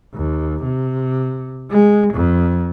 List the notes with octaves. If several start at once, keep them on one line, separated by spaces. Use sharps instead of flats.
D#2
C3
G#3
F2